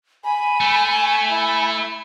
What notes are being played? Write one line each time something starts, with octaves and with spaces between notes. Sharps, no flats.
G#5 B5
A3
E4